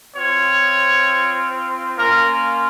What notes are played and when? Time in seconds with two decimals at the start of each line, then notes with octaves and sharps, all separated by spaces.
0.14 C4 F4 C#5
1.97 A#3 C#4 F4 A#4